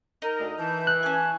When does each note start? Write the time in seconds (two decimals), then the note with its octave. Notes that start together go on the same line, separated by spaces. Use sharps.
0.22 D#4 A#4
0.39 D2 D3 D#5
0.58 E3 A5 G6
0.87 F#6
1.03 C#4 G#5 A5